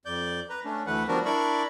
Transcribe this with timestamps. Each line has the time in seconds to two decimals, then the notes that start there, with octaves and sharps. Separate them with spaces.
0.05 F2 D5 G6
0.50 B4 A#5
0.65 A3 C#4 D4
0.87 D2 E3 A3 B4 F#5
1.08 F3 G3 B3 D4 F#4 A#4
1.25 D4 E4 A#4 D5 B5 C#6